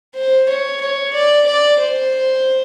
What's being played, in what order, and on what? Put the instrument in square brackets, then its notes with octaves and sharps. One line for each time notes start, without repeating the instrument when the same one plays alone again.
[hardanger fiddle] C5
C#5
C#5
D5
D5
C5